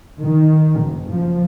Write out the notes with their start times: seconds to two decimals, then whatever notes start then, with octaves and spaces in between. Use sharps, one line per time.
0.21 D#3
0.81 F#1
1.12 F3